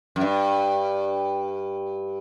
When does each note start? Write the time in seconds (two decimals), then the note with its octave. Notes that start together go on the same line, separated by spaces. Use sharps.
0.16 F#2
0.21 G2